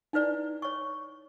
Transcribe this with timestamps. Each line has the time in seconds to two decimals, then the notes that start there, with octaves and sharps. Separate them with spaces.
0.13 D#4 E4 B4 D5
0.62 C#5 C#6